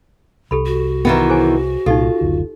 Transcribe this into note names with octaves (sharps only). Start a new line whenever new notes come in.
C2 G4 A4 B5
F#4
D#3 E3 B3 B4 E5 G5
G#4 C5 G#5
C2 A#2 D#4 F4 G4 A4
F#1 D2